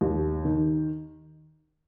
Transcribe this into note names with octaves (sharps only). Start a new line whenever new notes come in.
D#2
D#3